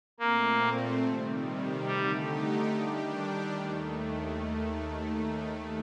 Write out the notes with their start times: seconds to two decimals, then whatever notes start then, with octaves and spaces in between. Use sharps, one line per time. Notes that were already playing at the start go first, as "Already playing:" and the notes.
0.20 A#2 A3 A#3 C4
1.03 C3 D#3 G3
1.86 D3 G3 A3 D#4 G4
2.69 D#3 G3 D4 G4
3.52 D#2 D#3 A3